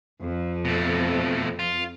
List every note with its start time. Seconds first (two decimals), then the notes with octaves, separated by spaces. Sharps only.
0.22 F2
0.65 B2 A3
1.59 F4